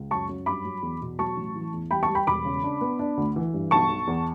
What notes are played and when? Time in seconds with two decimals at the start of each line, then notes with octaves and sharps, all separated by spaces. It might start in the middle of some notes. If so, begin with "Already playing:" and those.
Already playing: C#2
0.11 F#2 A5 C#6
0.29 F#2
0.46 G2 B5 D6
0.64 F#3
0.82 E2
1.01 B2
1.19 F#3 A5 C#6
1.36 A1
1.56 E3
1.73 E2
1.91 G3 G5 B5
2.03 A5 C#6
2.09 G3
2.15 G5 B5
2.27 E1 B5 D6
2.45 C#3
2.64 D4
2.81 B3
2.99 D4
3.17 D2
3.36 E3
3.54 G2
3.71 B1 A5 C#6
3.89 B1
4.07 E2